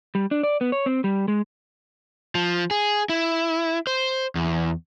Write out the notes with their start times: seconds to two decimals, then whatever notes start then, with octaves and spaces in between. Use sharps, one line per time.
0.15 G3
0.31 D4
0.43 D5
0.61 B3
0.72 C#5
0.86 C4
1.04 G3
1.28 G#3
2.35 F3
2.71 G#4
3.09 E4
3.87 C5
4.35 E2